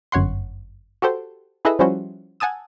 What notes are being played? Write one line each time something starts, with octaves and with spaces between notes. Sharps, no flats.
G1 F#2 C#5 F#5 C6
F#4 G4 A4 C5 G5
E4 G#4 A4 B4 D#5 E5
F3 G3 C#4 E4 F#4 C5
F#5 G#5 A5 D#6 E6